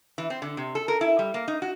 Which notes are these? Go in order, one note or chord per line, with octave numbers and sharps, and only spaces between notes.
E3
C4
D3
C3
A4
A#4
E4
G3
A#3
D#4
F#4